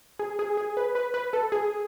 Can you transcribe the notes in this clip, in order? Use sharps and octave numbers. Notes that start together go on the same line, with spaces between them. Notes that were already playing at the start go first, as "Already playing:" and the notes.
G#4
G#4
G#4
B4
B4
B4
A4
G#4